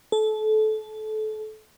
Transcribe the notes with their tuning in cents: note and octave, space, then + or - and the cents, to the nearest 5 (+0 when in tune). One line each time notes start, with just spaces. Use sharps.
A4 -25